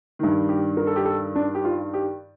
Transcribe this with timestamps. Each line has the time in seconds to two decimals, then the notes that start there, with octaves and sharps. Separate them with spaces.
0.19 G2 D#3
0.49 G4
0.77 A#4
0.87 A4
0.96 G4
1.05 A4
1.35 D4
1.55 G4
1.64 F4
1.94 G4